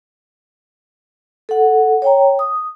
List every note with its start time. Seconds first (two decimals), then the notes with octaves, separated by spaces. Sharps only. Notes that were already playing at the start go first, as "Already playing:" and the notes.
1.49 A4 F#5
2.02 C#5 G5 A#5
2.39 D#6